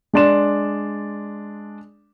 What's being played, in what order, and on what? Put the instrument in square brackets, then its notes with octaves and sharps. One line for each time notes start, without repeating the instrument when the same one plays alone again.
[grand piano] G#3 D4 D5 C6 E7